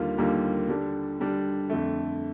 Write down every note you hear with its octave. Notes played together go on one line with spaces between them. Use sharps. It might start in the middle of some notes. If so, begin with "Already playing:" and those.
Already playing: D#2 D3 G3 A#3 F4
D#2 D3 G3 A#3 F4
D3 G3 D4
D3 G3 D4
F2 D3 A3